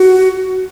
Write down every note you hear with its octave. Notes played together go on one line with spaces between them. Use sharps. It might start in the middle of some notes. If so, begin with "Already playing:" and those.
Already playing: F#4